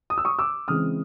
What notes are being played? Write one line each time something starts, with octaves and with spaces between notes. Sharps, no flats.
D#6
E6
C#6 D#6
D6 E6
C#3 E3 G#3 C4 D#6 F6